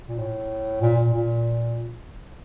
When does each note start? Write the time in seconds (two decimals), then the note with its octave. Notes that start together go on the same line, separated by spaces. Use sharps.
0.08 A#2
0.18 A2
0.81 A#2
0.97 A#2
1.13 A#2